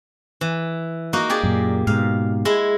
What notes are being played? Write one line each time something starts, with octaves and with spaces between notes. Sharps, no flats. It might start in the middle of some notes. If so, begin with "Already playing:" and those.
E3
A#3 D#4 F#4
G4 G#4 D5
F#2 A#2
G#2 B2 F5
G#3 E4